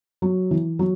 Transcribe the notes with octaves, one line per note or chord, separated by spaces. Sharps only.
F#3
E3
F#3